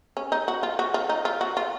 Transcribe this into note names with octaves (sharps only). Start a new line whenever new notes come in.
C#4
D#4
F#4
F4
F#4
F4
D#4
F4
F#4
F4